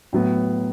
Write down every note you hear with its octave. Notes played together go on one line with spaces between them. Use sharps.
A2 F#3 B3